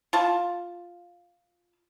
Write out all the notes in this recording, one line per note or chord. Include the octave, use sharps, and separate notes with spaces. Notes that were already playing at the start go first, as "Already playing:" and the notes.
F4 A5